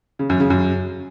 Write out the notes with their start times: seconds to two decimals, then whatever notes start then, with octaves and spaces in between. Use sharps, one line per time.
0.19 C#3
0.30 F#2
0.40 C#3
0.50 F#2